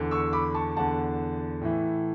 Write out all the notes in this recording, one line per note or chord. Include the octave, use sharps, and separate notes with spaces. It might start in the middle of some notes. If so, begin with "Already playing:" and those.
Already playing: E2 D3
C#6 E6
B5 D6
A5 C#6
E2 D3 F#5 A5
A2 E3